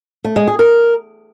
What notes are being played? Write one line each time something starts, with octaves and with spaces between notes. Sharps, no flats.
A3
G#3
G#4
A#4